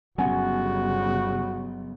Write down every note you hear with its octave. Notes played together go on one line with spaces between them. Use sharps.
G1 C#3 F#3 B3 C#4 F#4 F#5 G#5